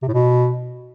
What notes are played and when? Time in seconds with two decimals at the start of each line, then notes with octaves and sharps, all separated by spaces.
0.02 C3
0.08 A2
0.13 B2